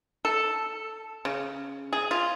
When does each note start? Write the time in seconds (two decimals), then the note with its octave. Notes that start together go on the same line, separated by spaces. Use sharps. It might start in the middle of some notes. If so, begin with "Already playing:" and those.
0.25 A4
1.25 C#3
1.93 G#4
2.11 F4